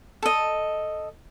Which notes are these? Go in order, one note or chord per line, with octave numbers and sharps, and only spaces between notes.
A4 D#5